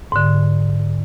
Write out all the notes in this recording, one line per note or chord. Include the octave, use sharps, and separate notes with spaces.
G#2 D3